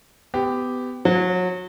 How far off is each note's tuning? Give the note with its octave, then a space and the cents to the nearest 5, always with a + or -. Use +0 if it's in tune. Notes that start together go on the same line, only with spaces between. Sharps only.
B3 +25 G4 +0
F#3 -30 C#5 -30